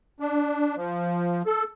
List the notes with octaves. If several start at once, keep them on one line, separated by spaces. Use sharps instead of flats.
D4
F3
A4